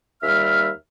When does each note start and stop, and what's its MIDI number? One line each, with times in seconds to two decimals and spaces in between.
0.23 0.68 39
0.23 0.68 55
0.23 0.68 76
0.23 0.68 89